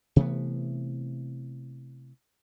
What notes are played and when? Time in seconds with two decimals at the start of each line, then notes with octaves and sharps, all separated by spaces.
0.16 C3 E3 A3 B3